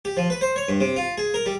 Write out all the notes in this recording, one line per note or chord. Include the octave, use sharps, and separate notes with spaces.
G4
F3
B4
C5
C#5
G2
C3
F4
G#4
A#4
G3